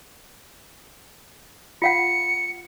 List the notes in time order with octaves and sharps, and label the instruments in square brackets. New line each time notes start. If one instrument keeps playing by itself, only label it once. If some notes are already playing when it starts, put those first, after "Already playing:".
[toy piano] F4 F5 F#5 [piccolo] C#7